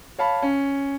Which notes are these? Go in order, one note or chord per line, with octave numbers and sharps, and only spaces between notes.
C#5 F5 A5 B5
C#4